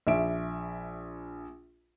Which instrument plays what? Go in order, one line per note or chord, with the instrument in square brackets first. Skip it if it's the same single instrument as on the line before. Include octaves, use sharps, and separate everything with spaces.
[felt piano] A#1 E5 D7